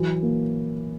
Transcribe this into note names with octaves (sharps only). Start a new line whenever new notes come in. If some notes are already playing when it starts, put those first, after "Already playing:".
Already playing: E3 F#3
A#3